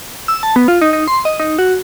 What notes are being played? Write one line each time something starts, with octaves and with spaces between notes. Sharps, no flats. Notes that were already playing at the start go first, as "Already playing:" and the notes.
E6
A5
B3
F4
D#4
D#4
C6
D#5
D#4
F#4